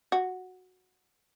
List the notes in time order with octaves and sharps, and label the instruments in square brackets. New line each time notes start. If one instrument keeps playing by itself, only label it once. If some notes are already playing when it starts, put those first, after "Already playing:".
[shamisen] F#4